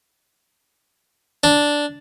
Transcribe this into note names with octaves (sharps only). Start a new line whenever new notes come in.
D4